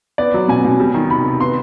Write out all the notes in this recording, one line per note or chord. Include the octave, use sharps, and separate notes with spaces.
B3 D5
F#3
B2 G#5
B2
G3
D#3
C3 B5
C3
B3 C6